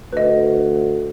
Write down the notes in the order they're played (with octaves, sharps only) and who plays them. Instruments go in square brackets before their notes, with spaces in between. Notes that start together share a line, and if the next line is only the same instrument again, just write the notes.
[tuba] D2 [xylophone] B4 D#5